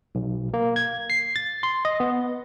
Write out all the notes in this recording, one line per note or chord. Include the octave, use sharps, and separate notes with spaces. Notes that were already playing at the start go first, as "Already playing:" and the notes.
B1
A#3
G#6
C7
A6
C6
D#5
B3